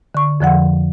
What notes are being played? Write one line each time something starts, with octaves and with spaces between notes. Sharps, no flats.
D3 C#6
F2 D3 F3 F#5